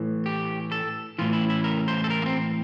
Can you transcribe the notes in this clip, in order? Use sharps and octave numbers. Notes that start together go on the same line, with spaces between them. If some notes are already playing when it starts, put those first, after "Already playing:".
Already playing: A2 E3
G4
A4
A2 E3 F4
E4
E4
A#4
C5
A4
A#4
A#3
C4